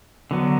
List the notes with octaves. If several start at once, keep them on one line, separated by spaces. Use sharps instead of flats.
D3 F#3 B3